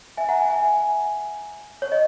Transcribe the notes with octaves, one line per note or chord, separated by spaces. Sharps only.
E5 G#5
F#5 A#5
E5 G#5
F#5
E5 G#5
C#5
D#5